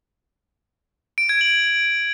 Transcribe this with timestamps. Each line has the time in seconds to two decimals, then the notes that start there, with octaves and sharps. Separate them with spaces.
1.18 D7
1.29 G#6
1.41 F#7